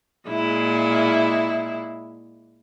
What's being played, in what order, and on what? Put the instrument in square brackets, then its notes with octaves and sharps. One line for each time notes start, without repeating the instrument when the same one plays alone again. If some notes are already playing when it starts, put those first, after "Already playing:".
[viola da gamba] A#2 G#3 E4